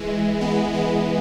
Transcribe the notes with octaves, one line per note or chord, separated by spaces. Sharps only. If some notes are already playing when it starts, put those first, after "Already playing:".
Already playing: E3 G#3
G#3 B3
E3 G#3